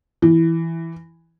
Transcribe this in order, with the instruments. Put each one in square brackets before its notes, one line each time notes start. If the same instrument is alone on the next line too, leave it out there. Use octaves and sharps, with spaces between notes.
[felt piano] E3